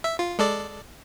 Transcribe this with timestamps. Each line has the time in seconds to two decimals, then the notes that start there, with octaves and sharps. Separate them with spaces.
0.04 E5
0.19 F4
0.39 G#3 A4 D5